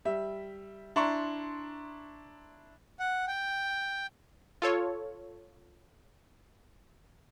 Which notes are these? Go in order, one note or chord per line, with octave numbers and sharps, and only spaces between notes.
G3 E5
D4 E4 A#5 C6 C#6
F#5
G5
F4 A4 C#5